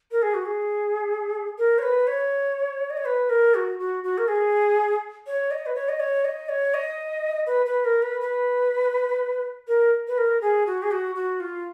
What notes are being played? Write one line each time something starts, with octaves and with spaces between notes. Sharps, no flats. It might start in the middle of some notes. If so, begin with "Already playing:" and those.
A#4
G#4
F#4
G#4
A#4
C#5
B4
C#5
D#5
C#5
B4
A#4
F#4
F#4
F#4
A#4
G#4
C#5
D#5
B4
C#5
D#5
C#5
D#5
C#5
D#5
B4
B4
A#4
B4
B4
A#4
B4
A#4
G#4
F#4
G#4
F#4
F#4
F4